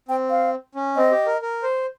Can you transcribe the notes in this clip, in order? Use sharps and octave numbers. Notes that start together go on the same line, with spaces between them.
C4 G5
F5
C#4
C4 D#5
G4
A#4
A#4
C5